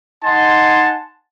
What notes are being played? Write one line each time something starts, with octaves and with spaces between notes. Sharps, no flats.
D#4 F#5 G#5 A5 C6